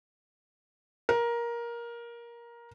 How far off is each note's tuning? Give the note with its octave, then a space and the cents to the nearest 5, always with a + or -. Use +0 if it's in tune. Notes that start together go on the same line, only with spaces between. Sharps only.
A#4 +15